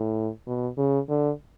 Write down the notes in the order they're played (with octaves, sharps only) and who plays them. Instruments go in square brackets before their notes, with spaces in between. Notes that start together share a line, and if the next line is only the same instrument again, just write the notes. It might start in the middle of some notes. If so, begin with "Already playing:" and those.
Already playing: [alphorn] A2
B2
C#3
D3